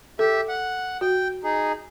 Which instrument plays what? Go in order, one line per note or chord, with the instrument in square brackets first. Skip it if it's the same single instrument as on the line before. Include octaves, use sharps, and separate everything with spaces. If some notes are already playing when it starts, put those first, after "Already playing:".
[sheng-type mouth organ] G4 E5 [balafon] A4
[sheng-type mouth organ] F#5
[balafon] F#4 [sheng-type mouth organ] G5
[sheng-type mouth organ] D#4 G#4